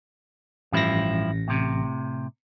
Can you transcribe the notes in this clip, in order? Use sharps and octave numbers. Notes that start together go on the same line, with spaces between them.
A1 G2 F3 E4 A#6
A2 C3